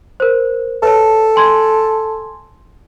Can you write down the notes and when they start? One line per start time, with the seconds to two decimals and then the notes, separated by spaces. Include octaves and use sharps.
0.20 A#4 C5
0.83 A4 B4 C#5 A5
1.36 G#5 C6 G#6